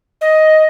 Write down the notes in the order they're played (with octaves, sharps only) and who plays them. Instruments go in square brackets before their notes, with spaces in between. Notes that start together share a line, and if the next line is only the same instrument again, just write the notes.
[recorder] D#5